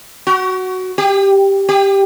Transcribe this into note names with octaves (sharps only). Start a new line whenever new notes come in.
F#4
G4
G4